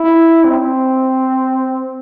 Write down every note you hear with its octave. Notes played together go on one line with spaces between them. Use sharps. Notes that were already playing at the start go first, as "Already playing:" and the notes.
Already playing: E4
C4